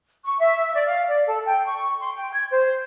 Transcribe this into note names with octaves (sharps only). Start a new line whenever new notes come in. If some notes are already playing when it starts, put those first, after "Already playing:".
C#6
E5
D5
F5
D5
A4
G5
C#6
C6
G5
G#6
C5